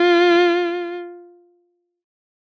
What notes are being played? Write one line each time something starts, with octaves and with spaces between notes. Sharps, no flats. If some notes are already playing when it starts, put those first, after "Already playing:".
Already playing: F4